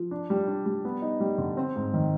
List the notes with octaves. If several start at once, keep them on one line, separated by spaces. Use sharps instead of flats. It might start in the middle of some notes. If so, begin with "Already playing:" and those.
Already playing: F3
D4
G3
D4
G3
B3
D#4
G3
D3
C4
G#2
D#3